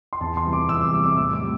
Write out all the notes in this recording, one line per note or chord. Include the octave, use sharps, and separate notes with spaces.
C6
E2 A5
C6
C3 E3 G3
D6
E2 E6
D6
C3 E3 G3 D6
D6
A2 E6
D6
G3